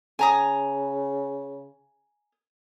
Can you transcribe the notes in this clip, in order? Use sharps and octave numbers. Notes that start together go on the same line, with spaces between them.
C#3 G#5 A#5 D#6